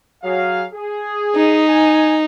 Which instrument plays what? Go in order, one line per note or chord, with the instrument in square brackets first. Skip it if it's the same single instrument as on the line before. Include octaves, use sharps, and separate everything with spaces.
[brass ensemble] F#3 G#4 F5
G#4
[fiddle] D#4
[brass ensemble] G#5